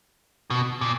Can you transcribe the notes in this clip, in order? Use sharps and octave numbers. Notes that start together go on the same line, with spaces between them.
B2
A#2